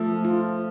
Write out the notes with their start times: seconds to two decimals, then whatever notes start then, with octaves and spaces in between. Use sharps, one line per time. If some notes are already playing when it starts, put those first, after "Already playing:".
Already playing: F3 A3 A4
0.25 F4